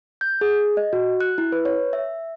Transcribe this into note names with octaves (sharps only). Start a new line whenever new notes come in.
G6
G#4
D#5
F#4
F#6
E4
B4
C#5
E5